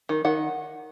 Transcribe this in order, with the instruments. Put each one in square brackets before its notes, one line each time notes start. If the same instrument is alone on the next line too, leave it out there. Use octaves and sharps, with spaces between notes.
[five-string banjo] D#3
D#3 F#5